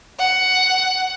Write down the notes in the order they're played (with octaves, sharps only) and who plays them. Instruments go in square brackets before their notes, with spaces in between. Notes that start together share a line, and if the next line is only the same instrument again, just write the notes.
[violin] F#5